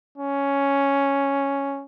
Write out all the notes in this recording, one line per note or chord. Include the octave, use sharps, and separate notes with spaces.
C#4